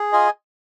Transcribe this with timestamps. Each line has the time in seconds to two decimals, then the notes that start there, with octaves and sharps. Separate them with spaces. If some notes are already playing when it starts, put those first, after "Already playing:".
Already playing: G#4
0.13 F4 D#5 G#5